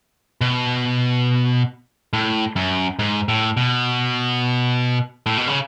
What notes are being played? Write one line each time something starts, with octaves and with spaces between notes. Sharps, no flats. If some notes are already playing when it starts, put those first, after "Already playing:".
B2
A2
F#2
G#2
A2
B2
A2
B2
C#3